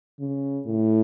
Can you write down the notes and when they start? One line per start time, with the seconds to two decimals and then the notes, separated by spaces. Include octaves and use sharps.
0.20 C#3
0.66 A2